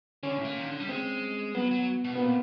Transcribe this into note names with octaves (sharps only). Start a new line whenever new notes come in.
D3 C#4
A2
A#2
D#3
D3
G3
G#3 C4
F#3 B3
F#3
B2
B3
A#2 C4